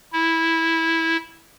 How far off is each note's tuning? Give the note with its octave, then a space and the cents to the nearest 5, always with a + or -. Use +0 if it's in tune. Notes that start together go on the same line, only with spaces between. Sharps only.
E4 -10